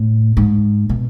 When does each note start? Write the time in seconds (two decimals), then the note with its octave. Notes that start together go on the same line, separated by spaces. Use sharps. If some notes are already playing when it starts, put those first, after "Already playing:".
Already playing: A2
0.37 G#2
0.89 B2